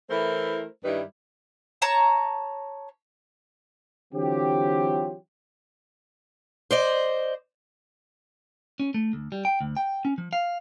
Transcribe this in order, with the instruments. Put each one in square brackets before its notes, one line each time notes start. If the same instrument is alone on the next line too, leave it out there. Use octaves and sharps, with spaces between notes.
[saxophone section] E3 A3 E4 A#4 C5
G2 D#3 G3 E4 B4
[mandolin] C#5 A5 A#5
[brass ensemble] D3 E3 F#3 C4 F4 G4
[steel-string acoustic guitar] C5 D5 D#5
[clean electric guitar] C#4
A3
D2
G3
G5
D2
G5
C#4
F3
F5